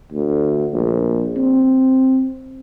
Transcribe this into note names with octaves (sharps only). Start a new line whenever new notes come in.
D2
A#1
C4